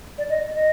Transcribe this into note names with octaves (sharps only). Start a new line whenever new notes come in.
D5
D#5
D#5